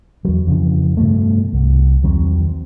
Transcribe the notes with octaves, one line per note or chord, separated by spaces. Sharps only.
E2 F#3
F2 C#3 E3
G2 B2 A3
C2
E2 D#3 F#3 C4